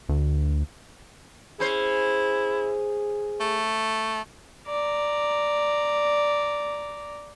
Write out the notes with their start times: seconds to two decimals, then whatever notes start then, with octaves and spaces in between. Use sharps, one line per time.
0.09 D2
1.60 C#4 E4 G#4 C5
3.40 A3
4.68 D5 A#5